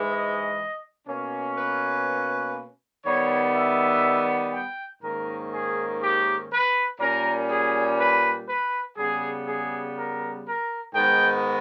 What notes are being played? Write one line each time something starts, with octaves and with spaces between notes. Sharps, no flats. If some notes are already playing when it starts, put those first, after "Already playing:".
Already playing: G#2 E3 G#3
D#5
B2 A#3 C#4
B4
D#3 G3 B3 C#5
E5
G5
G#2 D#3 A#3 C#4 A#4
G#4
G4
B4
A#2 G3 C#4 A#4
G#4
B4
B4
C#3 G3 B3 G#4
G#4
A#4
A#4
G#2 D#3 G#3 B3 G5